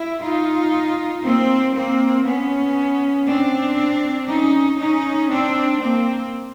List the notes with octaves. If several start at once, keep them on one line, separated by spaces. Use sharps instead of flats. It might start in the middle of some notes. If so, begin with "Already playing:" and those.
Already playing: E4
D#4 F4
A#3 C4
A#3 C4
B3 C#4
C4 D4
C#4 D#4
C#4 D#4
C4 D4
A#3 C4